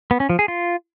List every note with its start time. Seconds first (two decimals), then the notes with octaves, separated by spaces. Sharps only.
0.11 B3
0.20 C#4
0.30 F3
0.39 G#4
0.48 F4